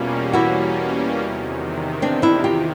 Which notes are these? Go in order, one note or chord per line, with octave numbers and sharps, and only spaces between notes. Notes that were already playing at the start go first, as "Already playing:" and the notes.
Already playing: E2 B2 G3 A#3 C#4 F4
E4 F#4
E2 C3 D#3
C4 D4
D4 E4
F4 G4